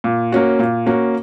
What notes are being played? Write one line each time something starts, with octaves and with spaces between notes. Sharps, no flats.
A#2
A#3 C#4 F#4
A#2
A#3 C#4 F#4